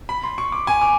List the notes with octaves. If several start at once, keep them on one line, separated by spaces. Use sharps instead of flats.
B5
C6
C#6
D6
G#5
D6